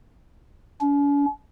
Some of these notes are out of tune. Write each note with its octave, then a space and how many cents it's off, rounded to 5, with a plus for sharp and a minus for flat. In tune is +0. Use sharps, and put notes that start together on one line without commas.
C#4 +45